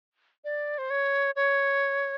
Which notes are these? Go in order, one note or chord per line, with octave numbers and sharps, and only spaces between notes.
D5
C5
C#5
C#5